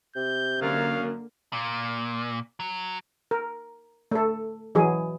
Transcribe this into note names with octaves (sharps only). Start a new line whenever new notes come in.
C3 G6
F#2 D3 A#3 F5
A#2
F#3
A#4
A3 A4
E3 F#3 G#4